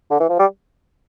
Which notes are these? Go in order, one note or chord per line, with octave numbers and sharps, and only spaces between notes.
D3
E3
F3
G3